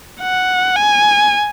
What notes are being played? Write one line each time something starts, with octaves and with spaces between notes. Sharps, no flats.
F#5
G#5